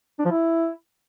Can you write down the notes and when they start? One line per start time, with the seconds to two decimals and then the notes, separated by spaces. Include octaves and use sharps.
0.19 D4
0.25 F3
0.31 E4